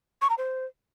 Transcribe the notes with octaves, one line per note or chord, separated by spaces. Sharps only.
C#6
A#5
C5